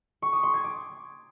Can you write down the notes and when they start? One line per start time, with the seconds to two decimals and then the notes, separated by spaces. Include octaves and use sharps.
0.22 C#6
0.33 D#6
0.43 C6
0.54 G#6
0.64 D6